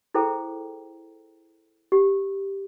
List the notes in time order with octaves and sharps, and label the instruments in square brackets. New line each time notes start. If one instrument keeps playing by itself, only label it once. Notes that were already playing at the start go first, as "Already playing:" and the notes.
[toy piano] E4 G#4 A4 C5 G5 A#5
G4